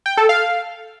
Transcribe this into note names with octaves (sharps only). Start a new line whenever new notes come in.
G5
A4
F5